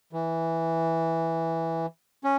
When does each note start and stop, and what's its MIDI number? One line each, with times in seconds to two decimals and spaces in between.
0.13 1.86 52
2.24 2.37 61